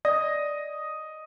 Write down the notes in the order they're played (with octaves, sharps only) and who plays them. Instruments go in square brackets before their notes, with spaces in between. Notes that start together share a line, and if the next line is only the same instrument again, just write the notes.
[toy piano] D5 [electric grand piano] D#5 D#6 A#6